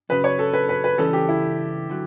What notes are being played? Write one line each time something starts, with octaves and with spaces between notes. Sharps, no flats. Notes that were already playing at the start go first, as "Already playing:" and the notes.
F#2 C#3 F#3 B4
C#5
A4
B4
B4
B4
C#2 C#3 E3 G3 C#4 A4
G4
E4
D3 F#3